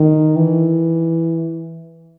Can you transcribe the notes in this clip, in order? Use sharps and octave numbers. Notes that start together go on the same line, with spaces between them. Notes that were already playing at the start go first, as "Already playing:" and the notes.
Already playing: D#3
E3